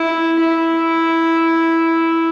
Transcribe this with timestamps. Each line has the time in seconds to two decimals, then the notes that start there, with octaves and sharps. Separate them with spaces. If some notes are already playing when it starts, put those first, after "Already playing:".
Already playing: E4
0.41 E4